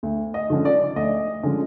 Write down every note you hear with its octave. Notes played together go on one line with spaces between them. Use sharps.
D2
D#5
D3 F3 G#3 C#4
D5
D2 D#5
D3 F3 G#3 C#4